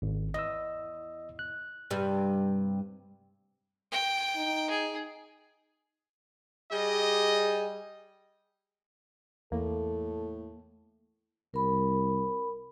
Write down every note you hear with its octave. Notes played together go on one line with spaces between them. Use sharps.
G#1
E2 D#5 E6
F#6
G2 C3 G3
G5
D#4
G#4
G3 G#4 D#5
E2 A2 A#3 A4
C2 A#4 B5